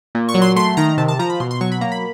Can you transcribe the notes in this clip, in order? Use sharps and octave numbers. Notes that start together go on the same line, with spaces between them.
A#2
C#6
F#3
C6
A3 C6
D#3 A#5
C3 A5
A5
F3 A#5
B5
B2 C6
C6
F#3 C#6
B5
A#3 A#5
B5